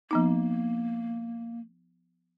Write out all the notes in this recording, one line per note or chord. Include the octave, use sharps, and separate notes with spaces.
F3 A#3 B3 D#4